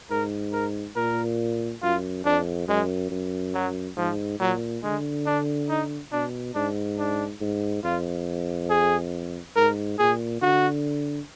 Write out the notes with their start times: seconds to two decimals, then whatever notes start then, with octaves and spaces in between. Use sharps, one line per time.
0.10 G#2 A#4
0.53 A#4
0.96 A#2 A#4
1.82 F#2 F4
2.25 F2 D4
2.68 F#2 G#3
3.11 F#2
3.54 F#3
3.97 G#2 F3
4.40 A#2 F#3
4.83 D3 G#3
5.26 D4
5.69 D#4
6.12 B2 D4
6.55 G#2 D4
6.98 D4
7.41 G#2
7.84 F2 F4
8.70 G#4
9.56 G#2 A#4
9.99 A#2 G#4
10.42 D3 F#4